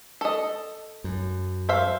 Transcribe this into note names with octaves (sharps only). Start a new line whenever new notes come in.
A4 D#5
F#2
C5 E5 F5